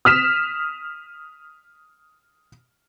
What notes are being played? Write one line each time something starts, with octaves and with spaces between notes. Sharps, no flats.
D#6 F6 B6 E7